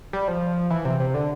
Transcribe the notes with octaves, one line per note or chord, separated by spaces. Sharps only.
G3
F3
E3
C3
C3
D3